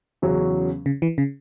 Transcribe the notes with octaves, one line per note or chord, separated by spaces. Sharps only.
E2 C#3 F#3 C#4
C#3
E3
C#3